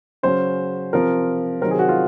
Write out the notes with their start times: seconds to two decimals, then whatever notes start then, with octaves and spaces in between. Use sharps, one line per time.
0.23 C#3 F#3 C#4 C5
0.93 C3 F3 C4 A#4
1.61 C3 D#3 F#3 C4 A#4
1.71 G#4
1.79 F#4
1.89 F4